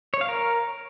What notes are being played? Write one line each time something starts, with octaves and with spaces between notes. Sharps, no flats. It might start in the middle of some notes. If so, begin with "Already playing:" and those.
C#5
F5
A#4